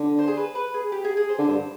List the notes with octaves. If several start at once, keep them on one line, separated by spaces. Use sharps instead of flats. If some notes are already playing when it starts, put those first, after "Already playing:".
Already playing: D3
C5
G#4
B4
B4
G#4
G4
G#4
G#4
C5
D3
G2